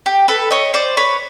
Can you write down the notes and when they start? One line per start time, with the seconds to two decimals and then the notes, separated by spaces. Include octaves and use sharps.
0.06 G4
0.28 A4 B4
0.51 C#5 D#5
0.74 C5 D5
0.97 B4 C#5